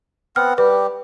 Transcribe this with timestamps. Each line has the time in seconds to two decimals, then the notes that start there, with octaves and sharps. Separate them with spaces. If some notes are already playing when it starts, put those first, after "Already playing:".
0.36 B3 C4 F#5 F6
0.58 G3 G4 B4